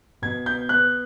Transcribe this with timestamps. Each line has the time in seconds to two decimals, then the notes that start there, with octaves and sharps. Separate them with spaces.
0.22 B2 G#6
0.46 B3 G6
0.69 B3 F#6